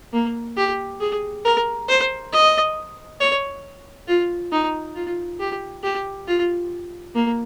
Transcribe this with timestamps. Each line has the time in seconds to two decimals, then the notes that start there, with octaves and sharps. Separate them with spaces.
0.13 A#3
0.57 G4
1.00 G#4
1.45 A#4
1.89 C5
2.32 D#5
3.20 C#5
4.08 F4
4.52 D#4
4.95 F4
5.40 G4
5.83 G4
6.27 F4
7.15 A#3